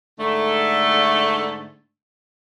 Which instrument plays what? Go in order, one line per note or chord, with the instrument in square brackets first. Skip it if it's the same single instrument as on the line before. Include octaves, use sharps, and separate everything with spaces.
[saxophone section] G#2 D3 A3